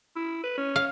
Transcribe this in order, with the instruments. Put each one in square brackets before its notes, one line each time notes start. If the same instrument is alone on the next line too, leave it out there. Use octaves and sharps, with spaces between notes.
[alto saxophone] E4
B4
C#4
[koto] F5